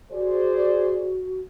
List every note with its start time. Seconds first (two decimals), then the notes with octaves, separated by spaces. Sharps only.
0.12 F#4 G#4 C5 D5